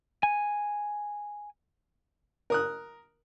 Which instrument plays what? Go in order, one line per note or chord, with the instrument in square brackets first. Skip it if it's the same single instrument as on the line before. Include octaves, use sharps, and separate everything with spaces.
[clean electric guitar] G#5
[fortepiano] A#4 D#6 F#6